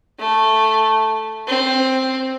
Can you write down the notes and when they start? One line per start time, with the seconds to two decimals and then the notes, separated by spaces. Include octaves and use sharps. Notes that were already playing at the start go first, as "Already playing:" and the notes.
0.19 A3
1.47 C4